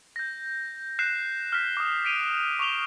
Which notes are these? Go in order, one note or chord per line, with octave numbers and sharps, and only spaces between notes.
G6 A#6
F#6 G6 C7 E7
F6 B6
D6 D#6
B6 D7 D#7 F7
C#6 D6 F7 G7